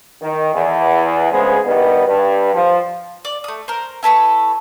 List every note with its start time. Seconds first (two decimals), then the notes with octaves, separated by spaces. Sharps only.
0.22 D#3
0.54 E2
1.31 D2 C#3 G#3 B3 G#4 C5
1.66 G2 D#3 G3 B3
2.07 G2
2.54 F3
3.25 D5
3.44 A3 D#6
3.68 A#4 C5
4.03 E4 A4 B4 C#6